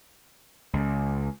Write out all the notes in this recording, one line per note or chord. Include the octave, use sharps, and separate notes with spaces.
C#2